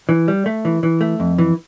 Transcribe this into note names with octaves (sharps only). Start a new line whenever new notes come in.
E3
G3
A3
E3
E3
A3
F2
E3